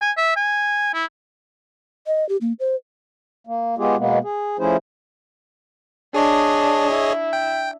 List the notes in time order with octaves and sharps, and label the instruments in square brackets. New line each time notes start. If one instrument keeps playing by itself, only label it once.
[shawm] G#5
E5
G#5
E4
[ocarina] D#5
G4
A#3
C5
[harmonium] A#3
G#3 B3 F4 G4 G#4
B2 G#3 A#3 B3
G#4
F3 A3 C#4 E4 G#4 C5
[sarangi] D4 [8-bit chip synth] G#4 C#5 D#5
[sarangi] E4
[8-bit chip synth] G5